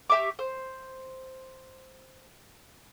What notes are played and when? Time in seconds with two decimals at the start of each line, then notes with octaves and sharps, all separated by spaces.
0.10 G4 E5 C#6 D6
0.39 C5